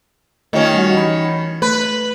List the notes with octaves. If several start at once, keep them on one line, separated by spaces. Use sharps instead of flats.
D#3 A3 C#4 F4 G4
G3 F#4
E3 B5
A3 B4